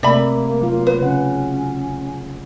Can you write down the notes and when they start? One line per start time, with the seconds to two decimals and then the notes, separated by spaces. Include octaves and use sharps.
0.03 C3 A3 A#3 D5 E5 B5
0.61 F#3 F4
0.87 B4
1.01 C#3 C#4 F#5